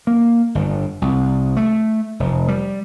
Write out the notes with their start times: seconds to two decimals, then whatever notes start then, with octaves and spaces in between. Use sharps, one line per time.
0.07 A#3
0.55 G1
1.02 C2
1.57 A3
2.20 F1
2.48 G3